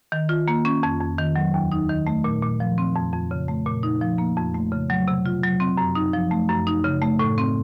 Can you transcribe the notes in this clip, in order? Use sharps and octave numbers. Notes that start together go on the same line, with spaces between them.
D#3
F4
A#3
C#4
F2
F2
D#3
F#3
D#2
D#4
D#3
A3
A#2
A#2
F3
C4
F2
F2
C#3
A3
A#2
D#4
F3
A#3
F2
A3
C#3
F#3
C3
F4
F#3
C4
F#2
D#4
F3
A3
F#2
D#4
C#3
A3
A2
C4